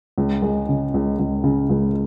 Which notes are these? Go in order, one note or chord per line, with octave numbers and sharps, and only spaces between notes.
C#2
G#3
C#3
C#2
C#2
C#3
C#2